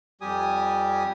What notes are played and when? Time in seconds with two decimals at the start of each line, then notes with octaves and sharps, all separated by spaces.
0.21 F2 G3 G4 G#5 D#6